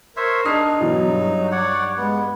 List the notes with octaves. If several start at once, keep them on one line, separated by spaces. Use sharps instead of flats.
A#4 C5 C#5 E5
D4 D#4 D#6 F6 C7
B2 E3 F#3
G2
C#5 D5 F#5
G#3 B3